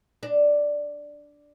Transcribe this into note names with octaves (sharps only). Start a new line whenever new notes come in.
D4